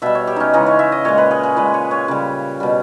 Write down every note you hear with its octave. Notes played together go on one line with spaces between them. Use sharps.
B2 G3 E5
C#5
G4
C#4 D#4
C#3 E3 G#3 D#4
C#5
E5
D#5
A#2 G#3 C#5
B4
G#4
G#4
A#2 G#3 B4
C#5
C#5
C#3 G3
B2 G3